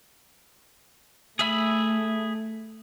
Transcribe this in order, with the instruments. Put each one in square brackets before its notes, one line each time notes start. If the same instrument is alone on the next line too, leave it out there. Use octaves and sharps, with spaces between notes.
[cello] A3 [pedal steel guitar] G#4 E5 B5